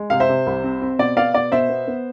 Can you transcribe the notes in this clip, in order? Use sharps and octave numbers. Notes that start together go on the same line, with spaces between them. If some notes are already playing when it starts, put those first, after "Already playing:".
Already playing: G#3
C3 F5
C5 E5
C3
C2
C4
C4
B2 D5
B3 D5 F5
B2 D5
B2 C5 E5
B3
B3